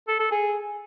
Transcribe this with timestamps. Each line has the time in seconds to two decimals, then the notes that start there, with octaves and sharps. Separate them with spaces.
0.08 A4
0.20 A4
0.31 G#4